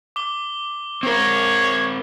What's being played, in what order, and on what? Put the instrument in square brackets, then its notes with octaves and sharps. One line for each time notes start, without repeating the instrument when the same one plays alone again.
[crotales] D6 G7
[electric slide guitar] C4 A#4 [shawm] C#5